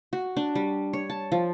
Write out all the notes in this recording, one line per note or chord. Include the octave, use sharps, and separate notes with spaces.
F#4
D4
G3
C#5
A5
F3